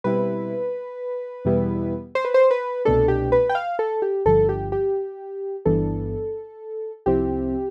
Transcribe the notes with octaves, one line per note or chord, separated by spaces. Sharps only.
B2 G3 C4 E4 B4
E2 B2 G3 B3 E4
C5
B4
C5
B4
C2 B2 A3 D4 A4
G4
B4
G5
F5
A4
G4
G1 G2 D3 F3 A4
G4
G4
G1 G2 E3 B3 D4 A4
C2 C3 F3 C4 E4 G4